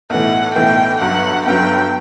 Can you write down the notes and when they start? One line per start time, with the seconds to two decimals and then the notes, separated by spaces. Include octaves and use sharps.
0.10 B1 A2 E3 F#5
0.55 B1 A2 E3 G5
1.01 G1 G2 F#3 F#5
1.46 G1 G2 F#3 G5